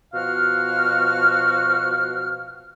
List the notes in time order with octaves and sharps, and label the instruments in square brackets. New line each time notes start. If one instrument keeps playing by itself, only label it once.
[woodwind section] B2 F3 F#4 F5 F6